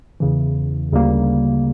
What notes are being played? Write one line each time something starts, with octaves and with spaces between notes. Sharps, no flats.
E2 C#3 E3
D2 C#3 G3 A#3